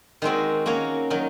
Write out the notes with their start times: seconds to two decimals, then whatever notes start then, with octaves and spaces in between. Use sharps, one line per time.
0.22 D#3 G#3 C4 F#4
0.66 A#3 C#4 F#4 C#5
1.10 D#3 F#3